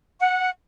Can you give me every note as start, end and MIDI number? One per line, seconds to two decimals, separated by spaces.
0.20 0.48 78